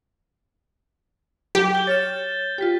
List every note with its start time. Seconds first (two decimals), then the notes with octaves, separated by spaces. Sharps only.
1.55 F#3 G4
1.75 G6 G7
1.87 C#5 F6 A6 E7
2.58 F4 G4 G6 B6